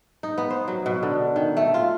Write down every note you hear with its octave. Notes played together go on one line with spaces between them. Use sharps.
D#4
B3
C5
F#3
B2
D3
D#3
A3
F4